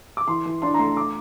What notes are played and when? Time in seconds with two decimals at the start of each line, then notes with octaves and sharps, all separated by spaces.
0.17 D6
0.28 E3 C6
0.46 E3
0.62 D4 C6
0.74 A#5
0.79 A3 C6
0.97 D6